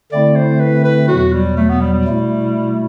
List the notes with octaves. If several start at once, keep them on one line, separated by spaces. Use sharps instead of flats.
D3 A3 C4 E4 D5
C5
B4
B4
E2 B2 F#3 F#4
G3
A3
B3
G3
G3
B2 A3 E4